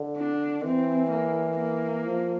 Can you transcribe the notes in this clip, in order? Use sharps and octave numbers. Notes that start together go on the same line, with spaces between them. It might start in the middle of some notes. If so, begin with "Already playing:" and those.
Already playing: D3
D4
E3 C4
A#3
A#3
F3